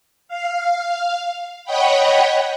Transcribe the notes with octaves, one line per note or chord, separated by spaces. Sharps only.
F5
C#5 D#5 F#5 G5 B5